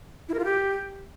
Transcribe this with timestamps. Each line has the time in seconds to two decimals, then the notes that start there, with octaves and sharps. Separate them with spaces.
0.29 E4
0.34 A#4
0.39 F4
0.45 G4